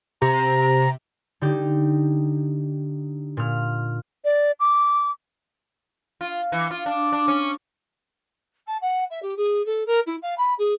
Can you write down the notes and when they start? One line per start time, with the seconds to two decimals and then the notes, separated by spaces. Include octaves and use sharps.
0.22 C3 A#5
1.41 D3 D#4 G4
3.37 A#2 F6
4.25 D5
4.60 D6
6.21 F4
6.52 E3
6.71 F4
6.86 D4
7.12 D4
7.28 C#4
8.67 A5
8.81 F#5
9.10 E5
9.22 G4
9.36 G#4
9.66 A4
9.86 A#4
10.06 E4
10.21 F5
10.37 B5
10.58 G#4